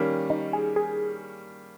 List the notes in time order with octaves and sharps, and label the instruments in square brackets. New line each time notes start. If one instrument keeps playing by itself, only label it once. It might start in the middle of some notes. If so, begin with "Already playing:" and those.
Already playing: [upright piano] D#3 G3 A#3 C#4
[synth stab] D#4
G#4
G#4